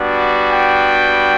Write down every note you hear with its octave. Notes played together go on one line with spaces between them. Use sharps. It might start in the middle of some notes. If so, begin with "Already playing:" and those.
Already playing: G3 B3 D4 F#4
G5